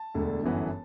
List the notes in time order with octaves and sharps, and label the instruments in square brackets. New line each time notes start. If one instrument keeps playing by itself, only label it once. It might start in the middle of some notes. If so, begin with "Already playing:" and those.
Already playing: [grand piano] A5
E1 D2 D3
G1 F#2 E3 B3